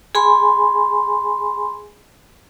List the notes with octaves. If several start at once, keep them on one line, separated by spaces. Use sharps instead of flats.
G#4 G#5 B5 C6